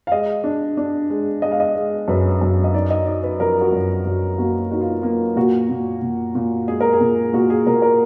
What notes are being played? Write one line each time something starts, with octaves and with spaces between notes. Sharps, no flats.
F5
G#3 D#5
D4
D4
G#3
G#3 D#5
F5
D#5
G#3
F#2 B4
F#2
D#5
D#4 D5
D#5
D#4 D5
B4
F3 A#4
F#4
F#2
F#2 F#4
A#3 F#4
D#4 F#4
F4
A#3 F4
A#2 F#4
A#2
A#2
A#2
G#3 G#4
A#4
G#4
A#2
G#4
A#2 F#4
G#4
A#2 A#4
A#4